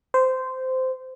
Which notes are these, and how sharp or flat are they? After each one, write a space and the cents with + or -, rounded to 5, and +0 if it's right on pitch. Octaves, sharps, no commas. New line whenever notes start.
C5 -15